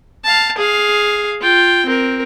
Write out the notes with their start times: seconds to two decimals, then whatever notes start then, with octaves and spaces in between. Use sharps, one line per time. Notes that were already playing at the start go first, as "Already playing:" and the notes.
0.24 F5 A5
0.58 G#4 F5
1.42 F4 G5
1.86 C4 A#4